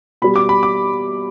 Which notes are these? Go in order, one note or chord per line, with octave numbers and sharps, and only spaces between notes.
B2 G3 B5
D6
B5
D6